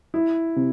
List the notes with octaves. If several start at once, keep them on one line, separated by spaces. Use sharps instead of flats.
E4
C3